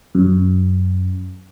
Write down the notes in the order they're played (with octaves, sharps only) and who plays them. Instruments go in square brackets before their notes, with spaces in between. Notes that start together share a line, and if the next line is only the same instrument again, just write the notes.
[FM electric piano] F#2